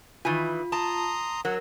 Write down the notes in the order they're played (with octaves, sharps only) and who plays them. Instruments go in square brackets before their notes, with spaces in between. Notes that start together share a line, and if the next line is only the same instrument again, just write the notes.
[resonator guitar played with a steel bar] D#3 E3 G#5 [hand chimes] F4
[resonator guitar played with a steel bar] A5 [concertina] A#5 C6 D#6
[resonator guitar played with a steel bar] F#3 [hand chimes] A#4 [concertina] F#5